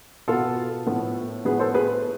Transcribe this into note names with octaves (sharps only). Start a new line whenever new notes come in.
B2 B3 F4 A4
A2 F3 B3
A2 F3 B3 G#4 B4
A4 C5
G#4 B4